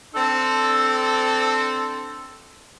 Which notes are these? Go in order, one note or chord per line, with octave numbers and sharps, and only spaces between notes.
C4 D4 A4